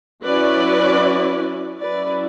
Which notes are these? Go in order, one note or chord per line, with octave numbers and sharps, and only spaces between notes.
F#3 C#4 E4 B4 D5
F#3 C#4 E4 B4 D5